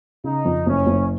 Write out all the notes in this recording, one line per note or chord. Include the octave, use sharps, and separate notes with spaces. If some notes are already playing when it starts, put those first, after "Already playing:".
C#3 D#4
F2
F#1 C#4
F#1